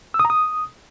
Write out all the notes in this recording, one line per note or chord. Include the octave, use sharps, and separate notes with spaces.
E6
D#6
A#5
D#6